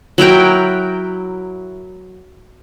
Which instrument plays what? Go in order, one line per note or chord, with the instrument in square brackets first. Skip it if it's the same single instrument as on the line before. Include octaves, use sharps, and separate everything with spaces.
[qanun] F#3 E4 A#4 G5